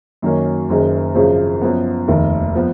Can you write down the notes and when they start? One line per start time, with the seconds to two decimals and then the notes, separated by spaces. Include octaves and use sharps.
0.22 F#2 D#3 F#3 A#3 C#4
0.69 F#1 F#2 D#3 G#3
1.15 G#1 F#2 C#3 F3
1.62 F#2 F3 B3
2.08 F1 D#2 D#3
2.55 F3 B3